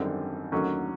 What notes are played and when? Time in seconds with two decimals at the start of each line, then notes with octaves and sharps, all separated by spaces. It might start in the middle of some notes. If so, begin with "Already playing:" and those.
Already playing: G#1 F#2 D3 G3 C4
0.52 D#2 D3 F#3 A3 C#4